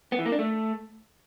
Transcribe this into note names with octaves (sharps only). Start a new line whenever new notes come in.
B3
E3
A#3
D4
A3